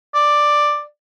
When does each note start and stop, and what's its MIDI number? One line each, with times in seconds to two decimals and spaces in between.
0.14 0.82 74